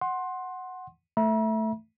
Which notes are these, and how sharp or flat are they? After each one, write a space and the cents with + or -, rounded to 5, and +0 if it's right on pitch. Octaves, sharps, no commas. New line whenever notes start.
F#5 +0 C6 +15
A3 +0 E5 +0 A#5 +45